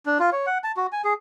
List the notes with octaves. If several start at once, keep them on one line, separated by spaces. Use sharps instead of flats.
D4
F4
C#5
F#5
A5
F#4
G#5
G#4